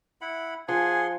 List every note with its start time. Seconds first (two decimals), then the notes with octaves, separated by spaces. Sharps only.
0.21 E4 F#5 B5
0.68 F3 G#4 F#5 G#5 C6